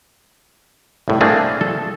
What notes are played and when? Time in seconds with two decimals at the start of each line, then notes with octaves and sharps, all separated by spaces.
1.08 C2 A2
1.21 A3 A#3 C4 D4 G#4
1.61 A4